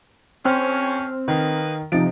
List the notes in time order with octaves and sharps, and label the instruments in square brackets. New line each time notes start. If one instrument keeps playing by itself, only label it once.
[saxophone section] F2 C#4 [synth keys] C4 [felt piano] G5 F6
[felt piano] D#3 [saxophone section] A#3 D#4 B4
[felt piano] C3 A6 D7 [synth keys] F3 D#4